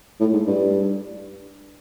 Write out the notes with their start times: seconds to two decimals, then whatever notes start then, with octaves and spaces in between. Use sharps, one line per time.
0.20 A2
0.33 G#2
0.47 G2